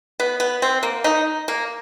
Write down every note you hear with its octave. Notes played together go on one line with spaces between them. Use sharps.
B3
B3
C4
A#3
D#4
A#3